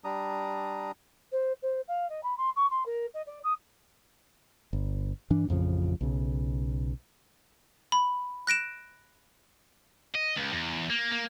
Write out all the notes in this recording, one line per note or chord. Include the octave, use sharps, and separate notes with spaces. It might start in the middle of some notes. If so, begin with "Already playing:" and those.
G3 D4 A#5 D#6
C5
C5
F5
D#5
B5
C6
C#6
C6
A#4
D#5
D5
D#6
G1
G2 E3 D4
A1 F2 C#3 F3
B1 C#3
B5
F#6 A#6 D7 E7
D#5
C#2
E2
A#3
A#3